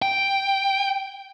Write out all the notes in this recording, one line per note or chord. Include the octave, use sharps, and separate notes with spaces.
G5